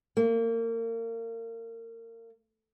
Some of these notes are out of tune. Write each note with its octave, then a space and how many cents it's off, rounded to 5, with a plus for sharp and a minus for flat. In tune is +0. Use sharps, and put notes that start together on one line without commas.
A#3 -30